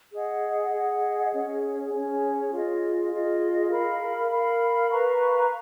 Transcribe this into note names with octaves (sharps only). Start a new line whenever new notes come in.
G#4 D#5 F#5
G#4 D#5 F#5
C#4 G#4 C#5
C#4 G#4 C#5
F4 G#4 D#5
F4 G#4 D#5
A#4 F5 B5
A#4 F5 B5
B4 F5 A#5 C#6